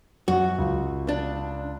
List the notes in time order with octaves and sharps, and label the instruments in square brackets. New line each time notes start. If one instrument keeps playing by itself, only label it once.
[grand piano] F#2 [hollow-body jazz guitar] F#4
[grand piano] C#2
[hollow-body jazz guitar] D4